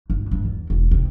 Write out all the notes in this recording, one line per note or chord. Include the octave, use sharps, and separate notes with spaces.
G1
G2
E2
E1
C3